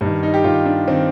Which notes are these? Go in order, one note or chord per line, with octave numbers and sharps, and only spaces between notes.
G2 D#3
D#4
G4
G2 D#3 F4
D4
D#3 C4